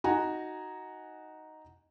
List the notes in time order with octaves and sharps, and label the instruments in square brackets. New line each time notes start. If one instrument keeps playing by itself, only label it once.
[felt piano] D#4 F#4 G#5 A#5